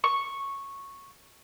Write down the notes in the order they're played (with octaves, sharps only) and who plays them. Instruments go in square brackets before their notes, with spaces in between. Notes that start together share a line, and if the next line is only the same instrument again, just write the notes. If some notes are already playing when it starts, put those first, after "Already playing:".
[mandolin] C#6